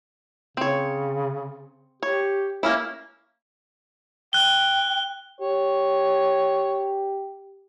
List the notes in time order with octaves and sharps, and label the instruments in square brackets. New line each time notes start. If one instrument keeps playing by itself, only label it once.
[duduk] C#3 [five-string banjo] C4 C#5
[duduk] G4 [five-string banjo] C#5
[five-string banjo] A#3 C#4 E4
[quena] G5 [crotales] F#6 G7
[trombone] G4 [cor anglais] C#5